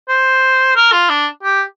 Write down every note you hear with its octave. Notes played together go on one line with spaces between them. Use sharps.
C5
A#4
F4
D4
G4